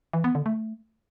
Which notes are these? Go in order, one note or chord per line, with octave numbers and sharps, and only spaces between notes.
E3
B3
D3
A3